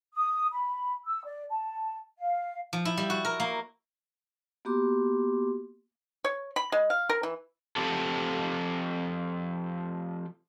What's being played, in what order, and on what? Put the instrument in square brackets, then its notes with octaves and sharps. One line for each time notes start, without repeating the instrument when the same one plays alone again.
[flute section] D#6
B5
E6
D5
A5
F5
[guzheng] F3
E4
G3
F#4
A#4
A#3
[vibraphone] A#3 B3 F#4 G4 C6 D6
[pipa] C#5
B5
G#3
F5
A#4
E3
[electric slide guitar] F3 C4 G4 A4